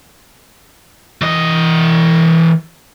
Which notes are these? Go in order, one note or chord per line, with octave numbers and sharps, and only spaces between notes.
E3 D#5